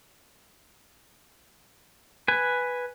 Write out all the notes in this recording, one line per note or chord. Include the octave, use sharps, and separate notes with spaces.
B4 G#5